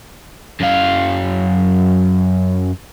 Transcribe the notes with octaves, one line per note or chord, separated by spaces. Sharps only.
F#2 F5